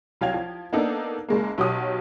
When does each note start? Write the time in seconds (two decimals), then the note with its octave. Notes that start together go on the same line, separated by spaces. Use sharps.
0.21 C2 F#3 F5 G5 G#6 F7
0.34 F3
0.73 A#3 B3 D4 D#4 A4
1.28 F#1 G#3 A#3
1.58 B1 F#3 G4 D#6